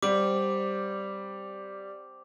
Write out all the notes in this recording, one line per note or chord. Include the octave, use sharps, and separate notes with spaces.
G3 C4 C5 F#5 D6